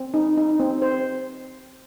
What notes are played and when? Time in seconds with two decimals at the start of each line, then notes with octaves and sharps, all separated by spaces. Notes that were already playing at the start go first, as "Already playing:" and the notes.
Already playing: C4
0.14 D#4
0.37 D#4
0.60 C4
0.82 C5